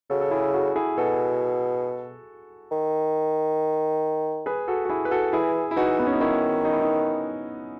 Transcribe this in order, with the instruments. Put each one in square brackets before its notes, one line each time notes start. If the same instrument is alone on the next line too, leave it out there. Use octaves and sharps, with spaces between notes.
[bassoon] C#3 [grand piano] F#4 A4
[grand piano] A4
E4 G#4
F#4 A4
E4 G#4
[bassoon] B2 [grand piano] F#4 A4
[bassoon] D#3
[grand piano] G#4 B4
F#4 A4
F#4
E4 G#4
B4
F#4 A4
[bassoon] E3 [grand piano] E4 G#4
[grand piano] E4
[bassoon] E3 [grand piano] D#4 F#4
[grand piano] B3
C#4
D#4
[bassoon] D#3 [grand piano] C#4 E4
[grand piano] D#4
E4
B3 D#4